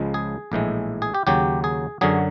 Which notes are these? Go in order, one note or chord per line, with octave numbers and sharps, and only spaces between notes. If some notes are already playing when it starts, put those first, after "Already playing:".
Already playing: C#2 C#3 F3 G#3
G#4
A#1 A2 E3 G#3
G#4
G4
D#2 C#3 F#3 G4
G#4
F#2 D3 F#3 G#4